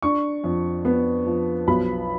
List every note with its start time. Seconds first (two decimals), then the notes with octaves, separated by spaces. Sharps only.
0.02 D4 C#6
0.44 F2
0.85 B3
1.26 F3
1.67 B1 B5